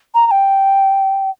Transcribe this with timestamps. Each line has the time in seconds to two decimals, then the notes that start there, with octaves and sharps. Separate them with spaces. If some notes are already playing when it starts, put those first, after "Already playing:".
0.15 A#5
0.26 A#5
0.31 G5